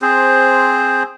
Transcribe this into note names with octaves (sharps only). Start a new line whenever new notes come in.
C4 G#4 C5